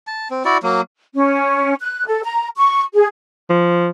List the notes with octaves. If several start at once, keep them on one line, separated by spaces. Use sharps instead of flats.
A5
C4
E4 F#4 D5
F#3 A#3
C#4
F#6
A4
A#5
C#6
G#4
F3